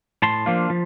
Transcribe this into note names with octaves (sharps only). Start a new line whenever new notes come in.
A2 A5 C6
F3 A#3 D4 F4
F3